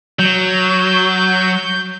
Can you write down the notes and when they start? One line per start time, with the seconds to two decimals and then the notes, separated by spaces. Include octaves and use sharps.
0.19 F#3 G6